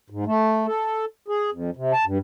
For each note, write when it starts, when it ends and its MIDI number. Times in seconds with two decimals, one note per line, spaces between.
0.10 0.24 44
0.26 0.66 57
0.66 1.05 69
1.28 1.50 68
1.52 1.70 41
1.77 1.92 48
1.93 2.05 81
2.05 2.18 43